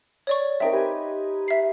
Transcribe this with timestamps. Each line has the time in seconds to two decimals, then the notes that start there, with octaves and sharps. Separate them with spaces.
0.27 C#5 D5 C#6
0.60 C4 D#4 A#4 E5 G5
0.72 G4 B4 G#5
1.48 E5 C7